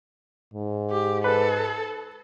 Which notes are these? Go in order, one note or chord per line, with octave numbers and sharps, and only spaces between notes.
G#2
G4
A4 B4